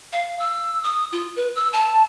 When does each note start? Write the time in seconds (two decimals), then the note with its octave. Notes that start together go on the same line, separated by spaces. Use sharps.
0.13 F5
0.39 E6
0.84 D#6
1.12 F4
1.36 B4
1.55 E6
1.73 A5